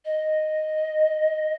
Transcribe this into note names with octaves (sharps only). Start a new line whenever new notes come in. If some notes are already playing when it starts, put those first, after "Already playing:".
D#5